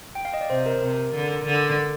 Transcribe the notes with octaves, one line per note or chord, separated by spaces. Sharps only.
G5
F5
D#5
D5
C3 C5
A#4
C3 A#4
D3
D3